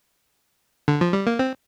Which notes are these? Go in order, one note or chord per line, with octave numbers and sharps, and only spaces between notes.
D3
F3
G3
A#3
C4